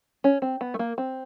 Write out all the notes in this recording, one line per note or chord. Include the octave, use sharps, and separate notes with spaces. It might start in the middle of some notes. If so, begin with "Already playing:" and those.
C#4
C4
B3
A3
A#3
C4